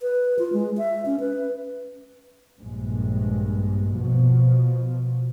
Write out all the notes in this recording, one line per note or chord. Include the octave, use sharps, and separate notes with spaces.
B4
F4
G#3
E5
C#4
B4
A#1 G2 G#3
B2 F3